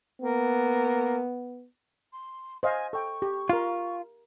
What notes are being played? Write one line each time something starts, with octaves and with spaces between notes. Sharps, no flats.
A#3 B3
C6
C5 D#5 F5 G#5
A4 G5 C#6
G4
F4 A#4 F5